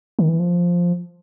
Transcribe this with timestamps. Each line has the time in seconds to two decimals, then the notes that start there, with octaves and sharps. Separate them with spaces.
0.19 D#3
0.28 E3
0.40 F3